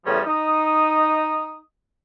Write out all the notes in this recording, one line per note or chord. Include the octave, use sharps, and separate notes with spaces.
E2 A2 C#3 F3 G3 C#4
D#4 D#6